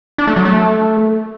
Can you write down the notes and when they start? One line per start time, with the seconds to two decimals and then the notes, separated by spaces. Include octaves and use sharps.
0.18 D4
0.27 A3
0.36 F#3
0.45 A3